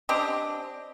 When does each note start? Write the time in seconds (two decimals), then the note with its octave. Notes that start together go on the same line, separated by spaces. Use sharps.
0.09 C4 D4 G4 D#5